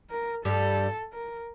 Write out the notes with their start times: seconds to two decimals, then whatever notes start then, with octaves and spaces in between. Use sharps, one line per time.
0.11 A#4
0.45 G2 G3 A4
1.13 A#4